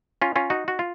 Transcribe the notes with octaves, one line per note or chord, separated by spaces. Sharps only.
C#4 F4
C#4 F4
D#4 F#4
F#4
F4